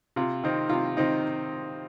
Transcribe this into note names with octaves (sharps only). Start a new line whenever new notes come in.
C3 F4
D#3 C4 D#4
C3 F4
D#3 C4 D#4